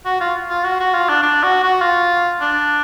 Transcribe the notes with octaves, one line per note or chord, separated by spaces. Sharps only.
F#4
F4
F4
F#4
F#4
F4
D4
D4
F#4
F#4
F4
D4